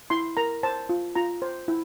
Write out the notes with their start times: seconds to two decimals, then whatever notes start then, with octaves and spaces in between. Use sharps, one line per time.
0.10 E4 C6
0.37 A#4 A#5
0.63 C5 A5
0.89 F4
1.15 F4 A#5
1.42 C5
1.68 E4